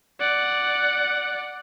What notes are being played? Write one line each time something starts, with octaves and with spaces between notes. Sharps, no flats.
D5 F#5